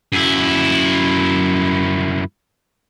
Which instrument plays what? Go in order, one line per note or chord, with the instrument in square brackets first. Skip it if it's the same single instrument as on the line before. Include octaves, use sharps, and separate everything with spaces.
[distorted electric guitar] F#2 E4